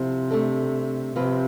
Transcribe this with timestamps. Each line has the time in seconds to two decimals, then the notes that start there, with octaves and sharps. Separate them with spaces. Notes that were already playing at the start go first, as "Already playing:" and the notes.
Already playing: C3 F3 C4 E4 A4
0.31 A3 D4 A4
1.16 C3 F3 C4 F4 B4